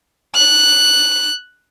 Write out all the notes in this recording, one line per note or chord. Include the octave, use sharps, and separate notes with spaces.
F#6